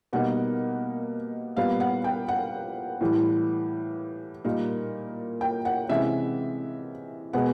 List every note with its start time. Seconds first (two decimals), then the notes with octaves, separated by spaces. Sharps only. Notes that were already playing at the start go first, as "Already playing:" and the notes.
0.13 B2 G3 A#3 D#4 F#5
1.57 A#2 G3 B3 F5
1.80 F#5
2.04 G5
2.28 F#5
3.01 A2 E3 G3
4.44 A#2 G3 A#3 D#4
5.41 G5
5.65 F#5
5.89 C3 E3 G#3 C#4 E5
7.33 B2 G#3 B3 F#5